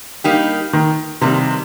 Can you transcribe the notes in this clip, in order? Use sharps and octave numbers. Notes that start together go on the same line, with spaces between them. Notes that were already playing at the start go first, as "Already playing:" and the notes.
G3 A#3 D#4 G4
D#3
F2 C3 D#3 G3